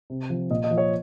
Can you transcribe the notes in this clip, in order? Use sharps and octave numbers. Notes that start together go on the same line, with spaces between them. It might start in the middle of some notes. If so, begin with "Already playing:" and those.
C3
F3
A#2 D#5
D#5
F3
C#5